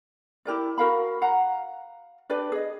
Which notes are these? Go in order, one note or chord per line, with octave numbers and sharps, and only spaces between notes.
E4 G4 A#4 D5
F#4 A#4 F5 B5
F5 F#5 A#5
D4 G4 B4 D5
G#4 D#5